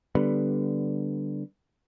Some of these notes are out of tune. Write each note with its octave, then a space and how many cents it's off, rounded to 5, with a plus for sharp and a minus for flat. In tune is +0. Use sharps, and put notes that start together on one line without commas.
D3 +0 G3 +5 B3 +0